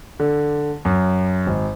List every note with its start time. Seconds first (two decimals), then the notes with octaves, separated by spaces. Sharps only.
0.20 D3
0.85 F#2
1.46 G#1